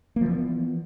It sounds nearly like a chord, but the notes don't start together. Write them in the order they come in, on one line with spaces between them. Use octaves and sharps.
A#3 F3 E3 B3